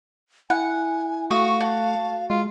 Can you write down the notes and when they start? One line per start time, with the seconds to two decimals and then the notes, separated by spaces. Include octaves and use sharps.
0.50 E4 F#5 G#5
1.31 A3 F#4 F5 C#6 D#6
1.60 F#4 A5
2.30 G#3 F4